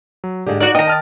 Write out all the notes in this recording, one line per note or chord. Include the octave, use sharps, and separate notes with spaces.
F#3
G#2 D3 G4 G#4
D#4 F#4 D5 F#6
D#3 D#5 G5 A#5
A5 F6 A6